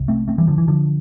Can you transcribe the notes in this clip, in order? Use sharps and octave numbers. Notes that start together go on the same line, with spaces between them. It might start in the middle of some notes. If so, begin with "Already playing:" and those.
Already playing: C2 C3
A3 C4
A3 C4
E3 G3
D3 F3
E3
D3 F3